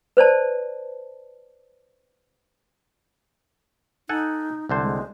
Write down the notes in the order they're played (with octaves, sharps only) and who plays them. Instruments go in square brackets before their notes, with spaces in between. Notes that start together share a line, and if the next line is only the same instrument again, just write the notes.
[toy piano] B4 C5 D5 A5
[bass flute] D#4 [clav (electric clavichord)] A4 F#5 G#5
[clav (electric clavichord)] C2 D3 C5
[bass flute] G#3